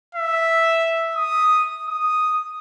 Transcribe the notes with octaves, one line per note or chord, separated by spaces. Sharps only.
E5
D#6
D#6